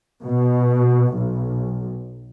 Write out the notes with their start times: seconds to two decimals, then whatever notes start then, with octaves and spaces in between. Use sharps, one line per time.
0.24 B2
1.16 B1